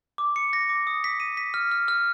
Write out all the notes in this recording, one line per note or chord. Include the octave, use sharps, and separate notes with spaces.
D6
C#7
A#6
D6
D#6
B6
D#7
B6
F6
F6
F6